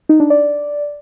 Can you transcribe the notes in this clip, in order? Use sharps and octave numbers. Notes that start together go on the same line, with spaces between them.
D#4
D4
D5